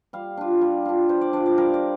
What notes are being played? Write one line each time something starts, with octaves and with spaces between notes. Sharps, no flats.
G3 F5
D4 F4
G3
D4 F4
G3 C5
D5
D4 F4 D5
D5
G3 A#4
D5